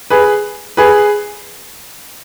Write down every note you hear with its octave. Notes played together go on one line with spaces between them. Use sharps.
G#4 B4
G#4 B4